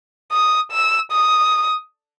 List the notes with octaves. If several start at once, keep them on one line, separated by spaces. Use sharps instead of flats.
D#6
E6
D#6